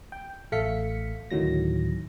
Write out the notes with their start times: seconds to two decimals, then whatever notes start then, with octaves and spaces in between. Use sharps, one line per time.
0.12 G5
0.52 A1 A3 A4 F5 B6 C#7
1.31 D2 A2 D#3 F#3 A#6